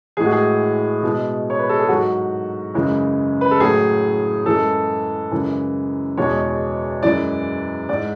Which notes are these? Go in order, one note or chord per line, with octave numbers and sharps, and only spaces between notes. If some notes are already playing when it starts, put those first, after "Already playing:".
A2 E3 G#3 G#4
F#4
G#4
B2 G#3
C#5
B4
A4
G#4
G#2 F#3 F#4
F#2 C#3 E3 G#3
B4
A4
A2 F#3 G#4
F#2 E3 G#3 A4
F#2 C#3 E3 G#3
E2 B2 G#3 C#5
F#2 E3 G#3 D5
G#2 G#3 D5